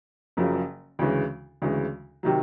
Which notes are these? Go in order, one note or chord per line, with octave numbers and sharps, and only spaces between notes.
F#1 F#2 C#3 F3
D2 C#3 E3 G#3
D2 C#3 E3 G#3
C3 D#3 F#3